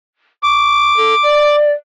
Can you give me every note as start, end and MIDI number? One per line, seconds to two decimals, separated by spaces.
0.43 0.96 85
0.43 1.56 86
0.97 1.14 69
1.23 1.71 74